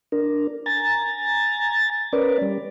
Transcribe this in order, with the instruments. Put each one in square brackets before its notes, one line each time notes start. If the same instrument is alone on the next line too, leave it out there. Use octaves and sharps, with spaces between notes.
[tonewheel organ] D4 A#4
G#5 A#5 A6
C#4 A#4 B4 D5
G3